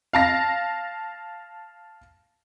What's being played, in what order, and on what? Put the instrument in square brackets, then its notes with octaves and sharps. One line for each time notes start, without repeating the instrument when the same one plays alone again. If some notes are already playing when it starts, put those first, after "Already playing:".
[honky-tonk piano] F5 A5 A#6